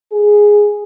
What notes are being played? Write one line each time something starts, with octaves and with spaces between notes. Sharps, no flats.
G#4